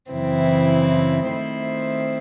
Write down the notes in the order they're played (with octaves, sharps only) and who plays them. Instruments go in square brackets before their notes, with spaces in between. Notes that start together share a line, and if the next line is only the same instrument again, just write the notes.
[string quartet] F#2 C#3 E3 C4 E4
D#3 A3 C4 E4 C5